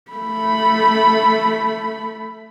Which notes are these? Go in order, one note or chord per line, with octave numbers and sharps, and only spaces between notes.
A3 B5